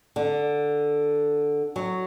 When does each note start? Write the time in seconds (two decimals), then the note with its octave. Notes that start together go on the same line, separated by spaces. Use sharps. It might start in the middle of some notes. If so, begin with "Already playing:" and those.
0.16 D3
1.76 F#3